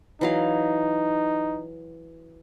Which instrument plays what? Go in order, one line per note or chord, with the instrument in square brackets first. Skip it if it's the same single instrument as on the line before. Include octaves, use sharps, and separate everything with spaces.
[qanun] E3 F#3 F5 [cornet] D#4